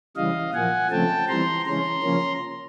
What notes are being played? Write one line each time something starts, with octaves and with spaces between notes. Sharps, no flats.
C#3 E3 G3 D#5 F5
A#2 F3 A#3 F#5 G#5
C#3 F3 A3 C4 G5 A5
E3 G3 C4 A#5 C6
C#3 E3 G#3 C#4 A#5 C6
C#3 F3 A#3 C#4